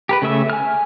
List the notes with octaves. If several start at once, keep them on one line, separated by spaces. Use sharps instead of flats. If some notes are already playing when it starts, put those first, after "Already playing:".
G4 A#4 B4
C#3 A3 E5 E6
G#5 F6